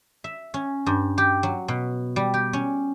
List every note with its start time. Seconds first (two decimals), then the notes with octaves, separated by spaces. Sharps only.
0.24 E5
0.54 C#4
0.86 G2
1.18 G4
1.43 F#3
1.68 B2
2.16 G3
2.34 G4
2.53 C#4